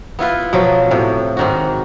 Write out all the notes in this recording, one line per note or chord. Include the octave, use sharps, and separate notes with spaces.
B3 E4 F4 B4
B2 F3 F#3
A2 C3
G#2 D#3 F#4